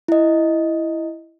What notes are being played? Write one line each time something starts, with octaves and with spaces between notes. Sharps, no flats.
E4 D#5